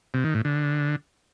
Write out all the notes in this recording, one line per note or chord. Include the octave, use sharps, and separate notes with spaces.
C3
D#3
A2
D3